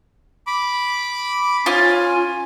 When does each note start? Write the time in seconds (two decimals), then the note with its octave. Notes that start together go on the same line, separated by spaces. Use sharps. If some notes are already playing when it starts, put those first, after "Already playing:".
0.47 B5 D6
1.66 C#4 F4 G#5